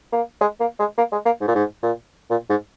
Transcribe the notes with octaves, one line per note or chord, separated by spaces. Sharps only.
A#3
G#3
A#3
G#3
A#3
G#3
A#3
G#2
A#2
G#2
A#2
A#2
G#2